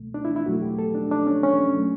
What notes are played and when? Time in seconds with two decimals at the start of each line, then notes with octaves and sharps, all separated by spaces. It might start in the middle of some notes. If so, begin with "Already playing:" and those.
Already playing: C#2 B2 A3
0.14 D4
0.25 E4
0.36 E4
0.46 E2 B2 F#3 A3 F#4
0.62 G4
0.79 A4
0.95 D4
1.11 D4
1.26 C#4
1.43 C#4
1.77 F#3 A3